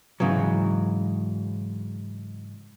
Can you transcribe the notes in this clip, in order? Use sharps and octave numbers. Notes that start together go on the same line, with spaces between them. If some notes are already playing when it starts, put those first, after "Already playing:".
G#2 C#3 E3 F#3